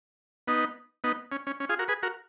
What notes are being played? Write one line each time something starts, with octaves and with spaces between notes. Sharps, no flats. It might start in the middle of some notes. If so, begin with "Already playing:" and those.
B3 D#4
B3 D#4
C#4
C#4
C#4
F4 G#4
F#4 A#4
G#4 B4
F#4 A#4